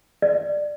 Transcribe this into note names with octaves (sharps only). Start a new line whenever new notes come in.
D5